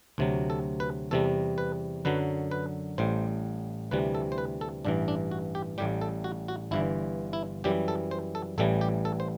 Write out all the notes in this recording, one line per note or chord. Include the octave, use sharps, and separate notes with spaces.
D2 C3 F#3
A4
B4
E2 C3 G3 A4
B4
F#2 D3 F#3 B4
B4
A1 A2 G3 C5
D2 C3 E3 G3 B4
A4
C5
B4
A4
A1 G2 E3 D4
D4
F#4
G4
A1 A2 G3 G4
A4
F#4
F#4
G1 G2 E3 E4
E4
F#2 E3 G3 G4
A4
C5
A4
A1 A2 E3 G3 A4
G4
A4
C5